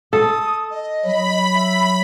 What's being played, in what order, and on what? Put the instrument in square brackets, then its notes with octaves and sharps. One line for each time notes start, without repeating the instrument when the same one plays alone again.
[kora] A4 [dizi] D#6
[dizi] D#5
[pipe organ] F#3 [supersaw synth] B5
[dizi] E5